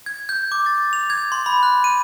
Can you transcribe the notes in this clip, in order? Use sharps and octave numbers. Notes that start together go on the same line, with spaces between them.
G#6
G6
D6
A6
F7
G#6
C6
B5
F#6
D#7